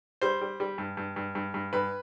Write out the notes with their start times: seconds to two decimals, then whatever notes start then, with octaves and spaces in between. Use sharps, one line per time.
0.22 G3 C5
0.41 G3
0.60 G3
0.78 G2
0.97 G2
1.16 G2
1.35 G2
1.54 G2
1.73 G2 B4